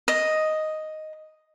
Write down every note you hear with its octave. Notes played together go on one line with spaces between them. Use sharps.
D#5